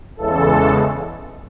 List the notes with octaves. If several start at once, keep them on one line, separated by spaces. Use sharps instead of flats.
E2 C#3 E3 G#3 A4